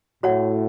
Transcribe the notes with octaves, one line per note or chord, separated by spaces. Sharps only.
A2 F#4 C#5 F#5